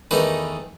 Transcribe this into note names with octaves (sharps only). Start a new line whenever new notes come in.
E2 D#3 A3 D#4 B4